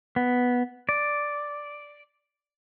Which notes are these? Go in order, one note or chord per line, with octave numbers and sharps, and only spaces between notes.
B3
D5